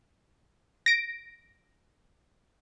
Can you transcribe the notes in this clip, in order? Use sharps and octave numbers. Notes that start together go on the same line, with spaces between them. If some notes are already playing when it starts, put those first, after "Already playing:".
A#6 D7